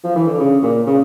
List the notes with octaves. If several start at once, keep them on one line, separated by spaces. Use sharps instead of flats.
F3
E3
D3
C#3
A#2
C#3